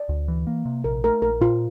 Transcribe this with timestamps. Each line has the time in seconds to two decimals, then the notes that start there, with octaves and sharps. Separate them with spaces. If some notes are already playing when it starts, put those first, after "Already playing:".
Already playing: D5
0.09 D2
0.28 E3
0.47 A#3
0.65 C3
0.84 A#1 A#4
1.04 A3 A#4
1.22 A#1 A#4
1.41 A#2 F4